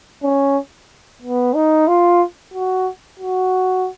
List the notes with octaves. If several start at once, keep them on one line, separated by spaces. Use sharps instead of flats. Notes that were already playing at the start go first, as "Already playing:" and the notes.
C#4
B3
D#4
F4
F#4
F#4